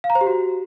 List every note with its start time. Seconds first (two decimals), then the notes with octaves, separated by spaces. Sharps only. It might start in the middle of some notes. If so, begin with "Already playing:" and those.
0.04 F5
0.10 A#5
0.15 C5
0.21 G4
0.27 F#4